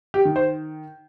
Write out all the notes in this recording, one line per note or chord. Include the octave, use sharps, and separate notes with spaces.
G4
D#3
C5